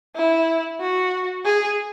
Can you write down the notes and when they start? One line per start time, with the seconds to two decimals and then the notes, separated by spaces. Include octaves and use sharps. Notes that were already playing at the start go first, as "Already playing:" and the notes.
0.15 E4
0.80 F#4
1.45 G#4